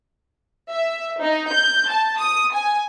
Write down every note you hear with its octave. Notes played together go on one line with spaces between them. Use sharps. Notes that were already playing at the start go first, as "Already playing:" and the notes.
E5
D#4
G6
A5
D#6
G#5